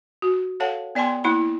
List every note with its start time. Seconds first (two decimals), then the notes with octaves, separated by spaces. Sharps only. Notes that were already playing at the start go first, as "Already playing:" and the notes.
0.22 F#4
0.60 A4 C#5 F5 F#5 A5
0.95 B3 D5 G5 G#5 C6
1.24 A#3 E4 B5